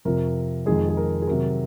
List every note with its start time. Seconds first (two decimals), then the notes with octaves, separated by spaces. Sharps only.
0.05 F2 C3 F3 A#4
0.66 F2 D#3 G#3 G#4
0.89 G#4
0.97 A#4
1.22 G#4
1.27 C3 D#3 F#3 A#4